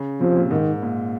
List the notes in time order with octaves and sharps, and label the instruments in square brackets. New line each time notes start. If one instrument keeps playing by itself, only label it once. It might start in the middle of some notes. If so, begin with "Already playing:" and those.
Already playing: [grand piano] C#3
[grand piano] C3 [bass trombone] F3
[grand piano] A#2
[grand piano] G#2 [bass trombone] D#3
[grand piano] A#2